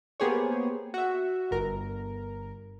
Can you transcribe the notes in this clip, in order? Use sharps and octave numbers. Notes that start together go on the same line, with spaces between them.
A#3 B3 G4 G#4 C5 C#5
F#4 E5
G1 A#4